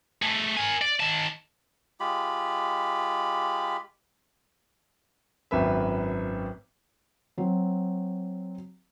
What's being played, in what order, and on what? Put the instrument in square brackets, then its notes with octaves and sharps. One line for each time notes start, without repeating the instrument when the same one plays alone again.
[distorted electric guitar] A3 G#4
A#4 G#5
D5
D#3 A5
[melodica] G#3 F4 G4 B5
[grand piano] G#1 F#2 B4 E5
[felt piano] F#3 C4